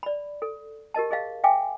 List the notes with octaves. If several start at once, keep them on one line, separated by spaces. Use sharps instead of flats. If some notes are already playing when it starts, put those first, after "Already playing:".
D5 B5
A4
G4 A#4 D#5 A5
G#4 D#5 F5
E5 F5 G5 G#5 D6